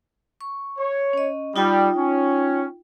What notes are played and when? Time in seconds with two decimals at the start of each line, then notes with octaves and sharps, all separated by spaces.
0.41 C#6
0.78 C#5
1.13 C#4 D#5
1.56 G3 D#4 F4 G5
1.97 C#4